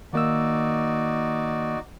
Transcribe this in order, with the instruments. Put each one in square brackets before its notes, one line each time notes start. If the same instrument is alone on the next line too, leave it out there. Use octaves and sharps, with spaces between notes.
[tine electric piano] D#3 A#3 E6 [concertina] D#4 F#4 D5